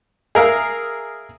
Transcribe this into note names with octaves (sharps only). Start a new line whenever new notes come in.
G#4 A#4 E5 F5